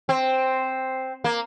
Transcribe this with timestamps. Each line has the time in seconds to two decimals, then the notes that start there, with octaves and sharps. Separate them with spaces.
0.09 C4
1.24 A#3